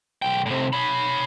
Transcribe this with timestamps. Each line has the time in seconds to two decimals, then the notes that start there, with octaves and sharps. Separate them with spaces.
0.22 B1 G5
0.46 A2 C3
0.73 C#5 B5